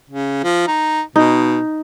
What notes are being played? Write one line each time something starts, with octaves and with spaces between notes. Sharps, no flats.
C#3
F3
D#4
B2 D#4